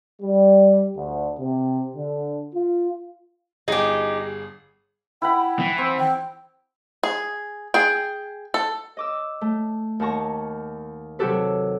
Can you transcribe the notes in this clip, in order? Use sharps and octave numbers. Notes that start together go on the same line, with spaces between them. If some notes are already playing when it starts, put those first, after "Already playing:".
G3
D2
C3
D3
F4
G1 D#4 G4 G#4
E4 F#5 G5 B5
E3
C4
G5
G#4
G#4 G5
A4
D#5 D6 E6
A3
D#2 F#5 A5 A#5 C#6
C3 F#3 F#4 G4 A4 B4